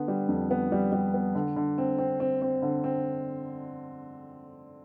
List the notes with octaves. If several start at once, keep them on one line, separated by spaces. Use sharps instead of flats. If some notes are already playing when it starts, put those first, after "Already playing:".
Already playing: D3 B3
G3
F2
B3
G3
G3
B3
D3
D3
C4
C4
C4
C4
D3
C4